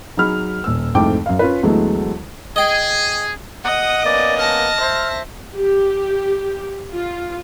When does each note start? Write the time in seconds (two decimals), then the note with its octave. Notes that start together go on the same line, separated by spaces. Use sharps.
0.17 F#3 D#4 G#4 B5 F6
0.64 D#1 E6
0.95 C2 F2 G#2 A3 G5 D6
1.26 F#2 F5
1.39 C#4 F4 B4
1.63 D2 E3 F#3 G#3 A3 B3
2.56 G#4 D#5 G5
3.65 D#5 F#5 D#6
4.05 A#3 B3 C#4 D5
4.39 A5 F6 A#6
4.80 C5 E5
5.56 G4
6.93 F4